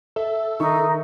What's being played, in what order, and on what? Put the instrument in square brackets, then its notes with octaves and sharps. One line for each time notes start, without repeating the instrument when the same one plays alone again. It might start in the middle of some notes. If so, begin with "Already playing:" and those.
[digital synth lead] A4 [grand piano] E5
[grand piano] D#3 E5 C#6 [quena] D#4